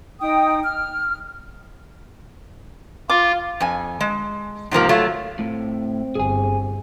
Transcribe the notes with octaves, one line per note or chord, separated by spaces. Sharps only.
D#4 G5 D#6
F6
F4 F5 D6
F2 G#5
G#3
G#2 C3 F3 A#3
F#3 A3 F4
A2 C4
G1 G#4 G#5